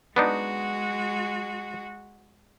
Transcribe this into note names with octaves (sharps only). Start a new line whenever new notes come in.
G#3 B3 D4 D#4 F#4